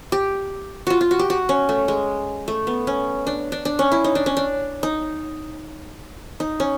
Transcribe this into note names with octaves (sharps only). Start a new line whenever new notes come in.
G4
F4 F#4
F4
F#4
G4
F#4
C#4
A3
G#3
A3
B3
C#4
D4
D4
D4
C#4
E4
D#4
D4
C#4
D4
D#4
D#4
C#4